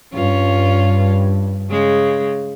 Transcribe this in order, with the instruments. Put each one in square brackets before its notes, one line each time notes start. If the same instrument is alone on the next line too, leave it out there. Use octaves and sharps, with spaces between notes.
[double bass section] G2 [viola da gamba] C#4 F4
[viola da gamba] C#3 G#3